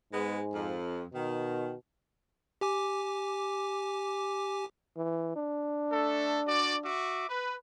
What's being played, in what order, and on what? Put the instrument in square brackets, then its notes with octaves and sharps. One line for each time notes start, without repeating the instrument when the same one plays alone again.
[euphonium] G#2 [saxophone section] G#3 B3
[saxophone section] F2
[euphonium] B2 [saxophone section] D#3
[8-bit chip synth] G4 G#5 D6
[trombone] E3
D4
[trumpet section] A3 A4
F#4 D5
F#4 E5 D6
B4